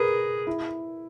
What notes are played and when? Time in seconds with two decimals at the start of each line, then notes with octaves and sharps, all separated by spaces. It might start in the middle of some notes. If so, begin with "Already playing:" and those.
Already playing: G#4 A#4 B4
0.47 E4